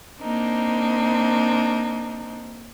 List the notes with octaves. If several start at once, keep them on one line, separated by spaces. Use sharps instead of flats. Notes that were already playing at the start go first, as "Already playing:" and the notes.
A#3 C4 D4 D#4